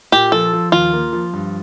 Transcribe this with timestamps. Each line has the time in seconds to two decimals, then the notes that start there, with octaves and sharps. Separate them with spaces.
0.12 A#2 G4
0.32 F3 A4
0.53 F3
0.72 D#2 F4
0.93 A#3
1.12 F3
1.33 G2